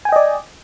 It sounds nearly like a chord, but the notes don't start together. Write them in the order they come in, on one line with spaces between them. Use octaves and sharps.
G#5 G5 D#5 D5